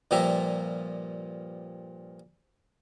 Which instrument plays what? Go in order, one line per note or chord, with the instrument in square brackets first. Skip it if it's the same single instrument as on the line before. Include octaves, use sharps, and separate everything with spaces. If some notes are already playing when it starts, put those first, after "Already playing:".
[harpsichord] G2 A#2 F3 G4 E5 A#5